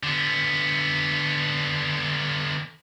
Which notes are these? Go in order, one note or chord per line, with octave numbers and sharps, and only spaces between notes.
D3 B3